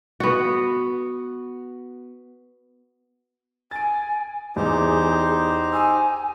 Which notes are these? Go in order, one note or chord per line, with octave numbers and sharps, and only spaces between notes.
B3 F#4
G#5 A6 D7
E2 D#4 G4 G#4 C5
G#5 D#6 E6